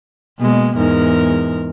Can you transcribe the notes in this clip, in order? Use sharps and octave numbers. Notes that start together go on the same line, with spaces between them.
B2 G#3 A#3
E2 G#2 A#4